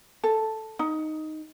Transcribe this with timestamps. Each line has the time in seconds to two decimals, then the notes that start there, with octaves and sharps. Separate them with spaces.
0.24 A4
0.79 D#4